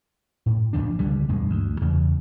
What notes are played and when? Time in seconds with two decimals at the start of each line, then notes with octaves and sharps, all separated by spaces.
0.46 A2
0.73 A#1 F2 F3 D4
0.99 C#2 D3 G3
1.29 E1 G2 G#3
1.50 D2
1.81 E2 C#3